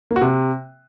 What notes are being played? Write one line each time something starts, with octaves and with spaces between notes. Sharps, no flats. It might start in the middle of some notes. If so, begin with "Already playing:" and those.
A#3
F#4
C3